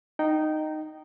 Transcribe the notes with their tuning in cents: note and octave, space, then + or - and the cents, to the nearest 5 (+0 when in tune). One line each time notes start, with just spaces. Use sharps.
D#4 -10 G5 -20